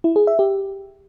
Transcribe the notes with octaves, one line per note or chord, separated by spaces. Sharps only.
E4
G#4
E5
G4